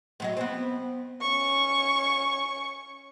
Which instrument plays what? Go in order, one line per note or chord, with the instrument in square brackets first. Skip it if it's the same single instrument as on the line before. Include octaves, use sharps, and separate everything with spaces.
[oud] A2 F#3 D#5
B3 C4
[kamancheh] C#4 C#6